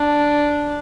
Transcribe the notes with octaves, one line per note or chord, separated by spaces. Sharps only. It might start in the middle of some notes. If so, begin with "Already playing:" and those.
Already playing: D4